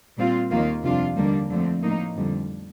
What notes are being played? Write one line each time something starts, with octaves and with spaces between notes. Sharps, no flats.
A#2 G3 C4 F4
D#2 D#3 A#3 F4
F2 C3 G3 D4 F4
D#2 D3 G3 A#3 D4
F2 D3 A3 C4
A2 F3 A#3 D#4
F2 D3 G3